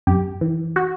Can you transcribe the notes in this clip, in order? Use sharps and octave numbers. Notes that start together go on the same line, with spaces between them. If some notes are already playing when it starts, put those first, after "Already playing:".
F#2 G4
E3
F#4